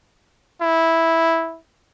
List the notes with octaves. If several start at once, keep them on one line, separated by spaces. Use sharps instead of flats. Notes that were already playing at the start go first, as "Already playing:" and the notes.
E4